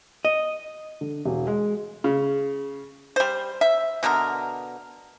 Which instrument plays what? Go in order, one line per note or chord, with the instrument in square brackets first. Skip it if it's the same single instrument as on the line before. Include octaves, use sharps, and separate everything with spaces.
[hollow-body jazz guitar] D#5
[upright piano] D3
E1
G#3
[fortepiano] C#3
[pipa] G3 C5
E5
B2 D3 B3 A#4